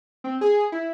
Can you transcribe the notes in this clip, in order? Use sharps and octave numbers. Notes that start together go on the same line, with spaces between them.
C4
G#4
E4